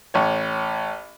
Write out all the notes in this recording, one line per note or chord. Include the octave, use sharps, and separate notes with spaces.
A1 C#5